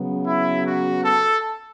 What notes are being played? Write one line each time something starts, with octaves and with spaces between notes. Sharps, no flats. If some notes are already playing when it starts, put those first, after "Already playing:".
Already playing: C#3 F#3 B3
E4
F#4
A4